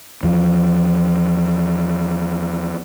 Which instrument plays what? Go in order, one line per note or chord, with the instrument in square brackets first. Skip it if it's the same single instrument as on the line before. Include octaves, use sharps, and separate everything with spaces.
[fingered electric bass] E2 F3